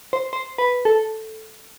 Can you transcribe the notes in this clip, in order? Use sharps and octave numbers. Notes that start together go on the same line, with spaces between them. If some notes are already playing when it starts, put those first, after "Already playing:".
C5
C5
B4
A4